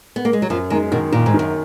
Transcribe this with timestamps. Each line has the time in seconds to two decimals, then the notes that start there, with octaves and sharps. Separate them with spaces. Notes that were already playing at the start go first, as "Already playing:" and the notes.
0.16 B3
0.25 A#3
0.33 G#3
0.42 F#3
0.50 F#2 F3
0.70 D#3 G#3
0.92 B2 D#3
1.12 A#2 D#3
1.26 G#2
1.34 D#3
1.39 F#2